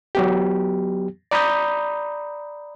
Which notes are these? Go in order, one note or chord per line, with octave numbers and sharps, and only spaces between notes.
F#3 B3 G4
D5 A#5 B5 D#6 G6